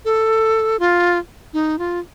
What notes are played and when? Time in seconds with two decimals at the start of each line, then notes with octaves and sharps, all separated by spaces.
0.05 A4
0.79 F4
1.53 D#4
1.79 F4